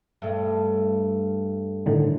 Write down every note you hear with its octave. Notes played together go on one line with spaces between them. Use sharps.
G2 A3
A2 D3 D#3